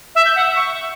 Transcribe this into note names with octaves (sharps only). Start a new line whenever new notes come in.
E5
G6
F#5
E5
C#6